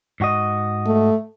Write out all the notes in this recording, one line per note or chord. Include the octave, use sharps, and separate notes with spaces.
G#2 F#4 D#5
A3